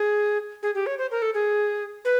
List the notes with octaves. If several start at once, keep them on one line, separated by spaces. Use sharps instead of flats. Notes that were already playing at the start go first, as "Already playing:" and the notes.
Already playing: G#4
G#4
G4
C#5
C5
A#4
A4
G#4
B4